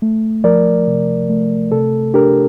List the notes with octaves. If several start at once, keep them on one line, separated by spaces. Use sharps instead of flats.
A3
F3 A#4 D5
C3
A3
C3 A4
D4 G4 A#4